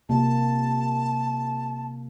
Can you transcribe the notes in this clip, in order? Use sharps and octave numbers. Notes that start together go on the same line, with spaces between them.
C3 A#3 A5